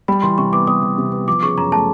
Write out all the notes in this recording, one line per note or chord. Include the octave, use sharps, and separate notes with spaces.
G3 B5
E3 C6
C3 C#6
B3 D6
G3 D#6
E3
C3
B3
F3 D6
C#3 C#6
F#2 A#5
A3 A5